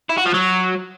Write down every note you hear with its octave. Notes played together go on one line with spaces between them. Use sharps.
E4
F#4
F3
F#3